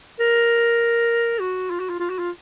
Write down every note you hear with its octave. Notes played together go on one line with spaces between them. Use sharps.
A#4
F#4
F4
F#4
F4
F4
F#4
F4